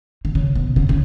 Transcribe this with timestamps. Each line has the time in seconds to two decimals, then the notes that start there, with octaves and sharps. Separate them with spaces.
0.25 D3
0.35 C#3
0.55 B2
0.76 C#3
0.89 C#3